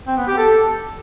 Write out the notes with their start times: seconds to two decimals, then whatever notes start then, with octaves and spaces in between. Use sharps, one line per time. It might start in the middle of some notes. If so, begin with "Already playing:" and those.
0.07 C4
0.17 B3
0.27 G4
0.37 A4